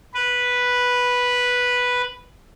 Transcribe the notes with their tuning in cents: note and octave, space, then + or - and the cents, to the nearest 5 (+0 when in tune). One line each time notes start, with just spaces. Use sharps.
B4 -5